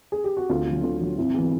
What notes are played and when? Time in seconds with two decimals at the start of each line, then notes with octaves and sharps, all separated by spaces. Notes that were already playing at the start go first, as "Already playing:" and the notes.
0.12 G#4
0.24 G4
0.37 F#4
0.49 D2 F4
0.66 D3 F#3
0.83 D2 F4
1.01 D3 F#3
1.18 G#1 E4
1.34 E3 G#3 B3